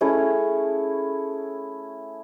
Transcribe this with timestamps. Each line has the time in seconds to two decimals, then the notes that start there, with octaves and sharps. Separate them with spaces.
0.01 A3 C#4 E4 G#4